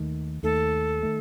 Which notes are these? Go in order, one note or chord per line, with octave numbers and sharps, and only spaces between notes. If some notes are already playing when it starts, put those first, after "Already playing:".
Already playing: D#2 D#3 A3
D#2 D#3 A3 A4
D#3 A3